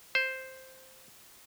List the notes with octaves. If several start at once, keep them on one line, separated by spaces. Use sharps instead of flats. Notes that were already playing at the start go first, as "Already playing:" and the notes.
C5